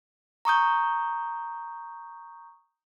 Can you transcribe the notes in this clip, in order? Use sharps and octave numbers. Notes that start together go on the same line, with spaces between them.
A#5 C#6 D#6 G6